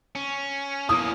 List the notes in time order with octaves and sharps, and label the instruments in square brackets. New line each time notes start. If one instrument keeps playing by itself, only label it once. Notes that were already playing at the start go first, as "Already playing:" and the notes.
[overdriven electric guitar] C#4
[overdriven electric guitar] A#3 C#4 [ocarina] E4 [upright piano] D#6